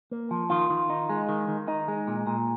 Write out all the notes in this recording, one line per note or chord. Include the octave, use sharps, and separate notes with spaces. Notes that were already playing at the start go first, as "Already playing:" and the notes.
A#3
F3
D#3 F4
D#3
D#4
G#3
D#3
D#3
D#4
G#3
A#2
A#2